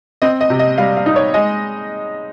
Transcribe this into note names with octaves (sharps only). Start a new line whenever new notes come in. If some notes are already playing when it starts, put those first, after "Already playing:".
C4 D#5
D#5
C3
D#5
G3 F5
F5
D#4
C#5
G#3 D#5